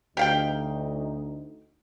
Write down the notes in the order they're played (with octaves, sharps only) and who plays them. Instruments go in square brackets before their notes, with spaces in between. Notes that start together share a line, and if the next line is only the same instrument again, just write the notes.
[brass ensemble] D2 D#4 [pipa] G4 F5 G5